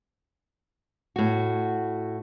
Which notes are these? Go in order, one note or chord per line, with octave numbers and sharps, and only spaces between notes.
A2 F#4